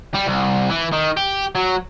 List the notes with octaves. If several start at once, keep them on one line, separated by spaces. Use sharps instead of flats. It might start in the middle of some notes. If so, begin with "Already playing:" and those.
G3
C2
E3
D#3
G4
F#3